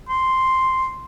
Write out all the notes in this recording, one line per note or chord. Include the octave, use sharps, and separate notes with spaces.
C6